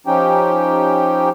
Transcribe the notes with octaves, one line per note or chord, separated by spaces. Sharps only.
F3 C#4 D#4 G4 G5